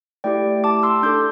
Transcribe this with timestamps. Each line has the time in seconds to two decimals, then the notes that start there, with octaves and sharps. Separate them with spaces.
0.24 A3 E4 G4 D5 G5
0.64 A5 D6
0.83 C6 E6
1.03 D4 A4 D6 G6